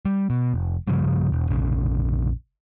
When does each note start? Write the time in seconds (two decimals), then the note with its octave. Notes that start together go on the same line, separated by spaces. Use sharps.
0.05 G3
0.30 B2
0.54 F1
0.88 G2 C#3 F3 G3
1.32 E1
1.49 F1 A#1 C#3